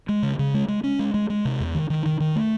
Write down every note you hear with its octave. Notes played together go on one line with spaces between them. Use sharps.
G#3
C#3
C#3
G#3
G#3
C#4
G#3
G#3
G#3
C3
E2
D#3
D#3
D#3
D#3
A3